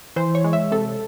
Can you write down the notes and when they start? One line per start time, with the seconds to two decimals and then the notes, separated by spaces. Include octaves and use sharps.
0.16 E3 C5
0.35 C#5
0.44 G#3
0.53 E5
0.71 C3 A4